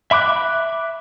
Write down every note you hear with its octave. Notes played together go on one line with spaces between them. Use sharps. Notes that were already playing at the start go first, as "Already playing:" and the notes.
E5 B5 D6 F#6